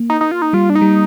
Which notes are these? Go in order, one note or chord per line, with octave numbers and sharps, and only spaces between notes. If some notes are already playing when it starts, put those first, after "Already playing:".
Already playing: A#3
D#4
D#4
F4
D#4
G3 F4
D4
D#4
G3